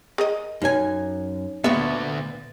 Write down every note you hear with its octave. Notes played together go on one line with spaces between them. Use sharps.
G#4 A#4 D#5
F#2 D#4 C#5 G#5
D2 A#2 B3 E5 A6